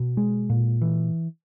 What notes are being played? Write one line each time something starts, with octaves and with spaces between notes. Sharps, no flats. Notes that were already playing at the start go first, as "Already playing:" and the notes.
Already playing: B2
G#3
A#2
E3